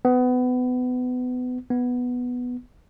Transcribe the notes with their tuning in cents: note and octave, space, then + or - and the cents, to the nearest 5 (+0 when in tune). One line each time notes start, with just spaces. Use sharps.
B3 +25
B3 +0